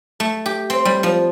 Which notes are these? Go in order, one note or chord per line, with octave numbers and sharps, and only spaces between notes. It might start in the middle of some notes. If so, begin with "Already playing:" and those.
A3
G4
C4
G3
F3